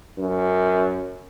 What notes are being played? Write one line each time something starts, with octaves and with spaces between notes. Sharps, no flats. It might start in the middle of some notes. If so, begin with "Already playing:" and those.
F#2